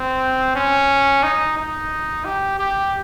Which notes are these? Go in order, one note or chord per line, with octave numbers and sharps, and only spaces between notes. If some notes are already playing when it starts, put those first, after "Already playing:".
Already playing: C4
C#4
D#4
D#4
G4
G4